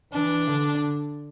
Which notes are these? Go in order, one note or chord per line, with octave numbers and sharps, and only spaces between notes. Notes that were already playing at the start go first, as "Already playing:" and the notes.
E3 D4
D3